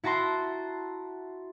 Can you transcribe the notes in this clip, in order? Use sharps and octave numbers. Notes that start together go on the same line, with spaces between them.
E4 F#4 A5 A#5 C6